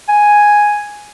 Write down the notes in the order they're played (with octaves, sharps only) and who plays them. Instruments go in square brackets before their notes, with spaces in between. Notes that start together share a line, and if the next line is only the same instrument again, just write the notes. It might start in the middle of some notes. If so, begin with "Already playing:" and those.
[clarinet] G#5